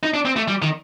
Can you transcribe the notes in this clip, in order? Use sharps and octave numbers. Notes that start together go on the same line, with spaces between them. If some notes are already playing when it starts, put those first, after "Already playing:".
D#4
D4
C4
A3
G3
D#3